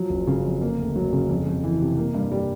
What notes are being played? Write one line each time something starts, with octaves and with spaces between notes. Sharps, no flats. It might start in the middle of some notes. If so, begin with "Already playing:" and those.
Already playing: F3 F#3
F#1
C#3
F2
A#3
D2
F#3
C#3
F2
F2
E3
C3
A#3
G2
G3